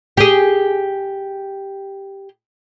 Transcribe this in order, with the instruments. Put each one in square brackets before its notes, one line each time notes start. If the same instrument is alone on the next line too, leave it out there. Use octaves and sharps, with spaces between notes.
[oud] G4 G#4